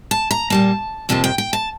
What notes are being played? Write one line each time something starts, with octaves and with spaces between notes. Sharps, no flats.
A5
A#5
A#2 G3 A#3 A5
F2 C3 F3 A#3 A5
G5
G5
A5